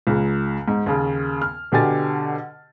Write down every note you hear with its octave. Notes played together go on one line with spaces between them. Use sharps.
C#2 C#3
G#2
D#2 C#3
F6
B2 D3 G4 G#5 A6